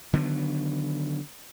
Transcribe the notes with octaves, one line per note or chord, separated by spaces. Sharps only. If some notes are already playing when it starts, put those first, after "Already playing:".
D3 D#3 F#3 B3